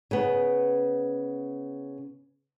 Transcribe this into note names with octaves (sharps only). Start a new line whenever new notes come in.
C#3 B3